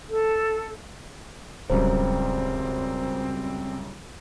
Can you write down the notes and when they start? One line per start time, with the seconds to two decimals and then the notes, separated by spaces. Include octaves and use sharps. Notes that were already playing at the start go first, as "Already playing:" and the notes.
0.09 A4
1.70 D1 C#2 F#2 G3 C4 C5 A#5